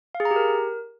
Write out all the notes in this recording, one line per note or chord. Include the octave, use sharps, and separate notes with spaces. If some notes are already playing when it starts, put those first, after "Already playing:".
F5
G#4
A#5
G4
A#4